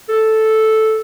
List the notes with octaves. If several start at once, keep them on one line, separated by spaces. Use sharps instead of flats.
A4